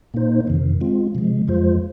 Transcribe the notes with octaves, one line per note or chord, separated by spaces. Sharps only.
A#2 A#3 D#4 C5
F2 C3 D#3
G#3 C4 F4
C3 F3 G#3
F2 F3 G#3 F4 C5